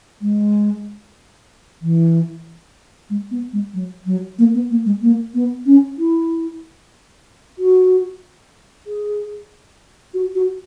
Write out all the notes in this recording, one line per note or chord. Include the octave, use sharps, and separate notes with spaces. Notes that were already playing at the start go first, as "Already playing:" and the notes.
G#3
E3
G#3
B3
G#3
F#3
F#3
A#3
B3
A#3
G#3
A#3
B3
C#4
E4
F#4
G#4
F#4
F#4